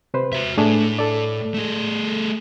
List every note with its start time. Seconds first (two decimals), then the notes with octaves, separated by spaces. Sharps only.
0.14 C3 B4 C5
0.33 F#4 E5
0.58 A2 A3 D4 G#4
0.99 A4 D5
1.54 A3 G#4